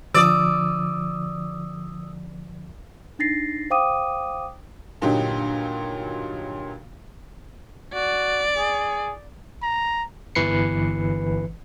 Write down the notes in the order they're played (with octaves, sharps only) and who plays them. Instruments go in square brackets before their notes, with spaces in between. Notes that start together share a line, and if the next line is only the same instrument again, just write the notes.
[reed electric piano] D3 F3 [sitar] D5 [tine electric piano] D#6 E6
[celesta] D4 D#4 A6 A#6 C7
C5 F5 G5 D6 D#6 D#7
[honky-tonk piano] G2 A#2 D3 F#3 D#4 G4
[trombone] F#4 [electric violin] D5
[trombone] G#4
[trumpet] A#5
[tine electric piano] G1 E3 B4 C7 C#7